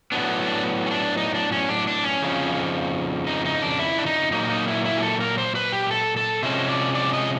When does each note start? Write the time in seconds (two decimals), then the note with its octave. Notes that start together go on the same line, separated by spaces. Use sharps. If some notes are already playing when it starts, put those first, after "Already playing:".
0.12 A2 F#3 B3 D4
0.46 D4
0.86 C#4
0.91 D4
1.17 D#4
1.34 D4
1.52 C#4
1.69 D4
1.87 D4
2.04 C#4
2.22 F2 C#3 F3
3.27 D#4
3.45 D#4
3.62 D4
3.79 E4
3.98 D4
4.06 D#4
4.32 A#2 F#3 A#3 D#4
4.50 D#4
4.68 E4
4.85 E4
4.98 G#4
5.02 A4
5.20 A#4
5.38 C5
5.55 B4
5.72 G4
5.91 A4
6.17 A4
6.43 C3 F3 G#3 C#4 C5
6.69 D5
6.95 D5
7.13 D#5